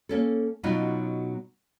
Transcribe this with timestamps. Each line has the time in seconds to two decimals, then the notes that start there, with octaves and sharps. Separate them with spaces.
0.09 A#3 C#4 A4
0.63 B2 F#3 C#4 D#4 F4 F#4